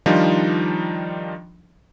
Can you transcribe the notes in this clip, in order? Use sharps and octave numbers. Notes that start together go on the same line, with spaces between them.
D#3 F3 G3 D4 D#4 F4